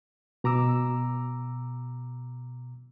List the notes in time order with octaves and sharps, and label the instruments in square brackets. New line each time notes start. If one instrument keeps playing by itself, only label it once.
[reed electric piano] B2 A#5 D6 E6